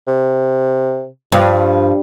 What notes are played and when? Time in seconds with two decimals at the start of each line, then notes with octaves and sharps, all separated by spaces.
0.08 C3
1.32 G2 F3